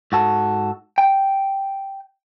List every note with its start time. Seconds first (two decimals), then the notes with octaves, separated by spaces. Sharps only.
0.12 G#2 F#4 A4
0.98 G5